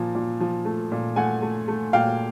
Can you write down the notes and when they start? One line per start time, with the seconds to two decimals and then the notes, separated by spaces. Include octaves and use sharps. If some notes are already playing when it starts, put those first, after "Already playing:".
Already playing: A#2 F3
0.15 A#2
0.40 F3
0.65 A3
0.92 A#2
1.16 A3 F#5 G#5
1.42 A3
1.68 A3
1.93 A#2 F5 G5